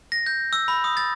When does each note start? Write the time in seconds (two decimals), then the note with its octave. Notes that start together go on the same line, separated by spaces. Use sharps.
0.12 A#6
0.26 G6
0.53 E6
0.68 B5
0.84 D#6
0.97 A6